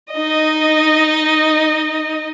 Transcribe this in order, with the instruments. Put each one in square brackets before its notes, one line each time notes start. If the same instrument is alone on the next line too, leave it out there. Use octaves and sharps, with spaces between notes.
[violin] D#4 D#5